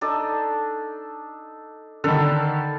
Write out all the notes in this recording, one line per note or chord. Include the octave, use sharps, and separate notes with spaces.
D4 D#4 A4
D3 D#3 A4 B5